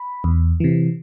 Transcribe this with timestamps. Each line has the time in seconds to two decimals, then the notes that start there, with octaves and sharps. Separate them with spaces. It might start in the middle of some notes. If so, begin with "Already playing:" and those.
Already playing: B5
0.24 E2
0.60 C3 E3